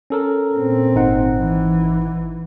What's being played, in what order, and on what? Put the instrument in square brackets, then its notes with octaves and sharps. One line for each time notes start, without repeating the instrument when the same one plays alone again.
[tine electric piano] C#4 A4 A#4
[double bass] A#2 C4
[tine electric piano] G#1 D#4 F#5
[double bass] E3